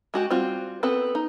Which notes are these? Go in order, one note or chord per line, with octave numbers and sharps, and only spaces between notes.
G#3 F#4 G4
G3 C4 F4 F#4
B3 C4 A4 B4
D#4